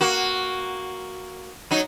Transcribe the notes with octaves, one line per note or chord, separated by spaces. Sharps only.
A#3 F#4
F#3 D#4